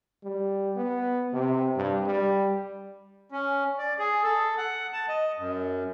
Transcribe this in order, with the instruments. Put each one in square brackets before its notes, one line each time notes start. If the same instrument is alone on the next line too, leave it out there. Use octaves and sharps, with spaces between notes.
[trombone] G3
B3
C3
G2
G3
[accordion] C#4
D5
G#4
A4
F#5
A5
D#5
F#2